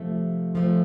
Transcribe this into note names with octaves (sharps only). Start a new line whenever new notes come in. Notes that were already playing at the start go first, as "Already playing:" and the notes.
Already playing: C3 F3 A3
C3 F3 A3